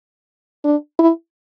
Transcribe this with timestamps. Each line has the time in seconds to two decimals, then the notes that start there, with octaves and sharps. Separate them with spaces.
0.65 D4
0.99 E4